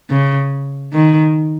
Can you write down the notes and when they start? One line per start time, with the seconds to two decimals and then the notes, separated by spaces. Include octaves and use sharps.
0.10 C#3
0.93 D#3